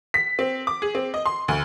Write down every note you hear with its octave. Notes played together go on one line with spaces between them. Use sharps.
B6
C4
D6
G#4
C4
D#5
C6
D2